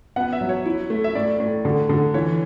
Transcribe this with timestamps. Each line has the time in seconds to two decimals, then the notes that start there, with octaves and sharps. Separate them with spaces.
0.16 B3 F#5
0.33 E5
0.41 F#3
0.49 C#5
0.66 E4
0.90 A3
1.04 E5
1.15 A2 D5
1.40 A2
1.65 D3
1.89 D3
2.14 E3 C#5